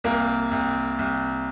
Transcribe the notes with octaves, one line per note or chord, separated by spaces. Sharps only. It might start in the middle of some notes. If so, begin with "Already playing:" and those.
C2 A#3
C2
C2